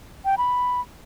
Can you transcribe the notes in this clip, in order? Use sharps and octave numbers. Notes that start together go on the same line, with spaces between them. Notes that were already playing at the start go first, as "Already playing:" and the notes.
G5
B5